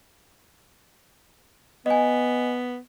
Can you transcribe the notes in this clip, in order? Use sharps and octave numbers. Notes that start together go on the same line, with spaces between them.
B3 D#5 G#5